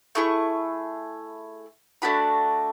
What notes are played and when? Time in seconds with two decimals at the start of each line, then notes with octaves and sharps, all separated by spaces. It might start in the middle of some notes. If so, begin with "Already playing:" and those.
0.15 A3 E4 G#4 C#6
2.02 A3 D4 F#4 B5